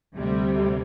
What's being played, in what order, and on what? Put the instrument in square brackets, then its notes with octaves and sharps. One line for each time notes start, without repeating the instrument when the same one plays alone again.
[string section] D2 C3 G3